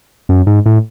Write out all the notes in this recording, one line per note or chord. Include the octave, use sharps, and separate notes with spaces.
F#2
G#2
A2